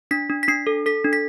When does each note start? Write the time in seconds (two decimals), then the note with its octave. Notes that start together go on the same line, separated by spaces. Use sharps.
0.11 D4 B6
0.30 D4
0.43 B6
0.48 D4 C7
0.67 A4
0.86 A4 B6
1.04 D4
1.13 B6